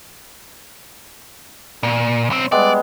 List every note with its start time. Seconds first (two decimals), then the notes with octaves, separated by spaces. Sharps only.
1.83 A#2
2.30 B1 C4
2.52 G3 G#3 B3 D5